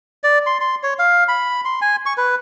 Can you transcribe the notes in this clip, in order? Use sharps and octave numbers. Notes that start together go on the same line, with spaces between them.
D5
C6
C6
C#5
F5
B5
C6
G#5
C#6
B4